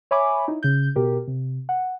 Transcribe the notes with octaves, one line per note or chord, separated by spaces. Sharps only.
C#5 E5 G#5 B5 D6
D#4 E4
C#3 G6
B2 G4 A#4
C3
F#5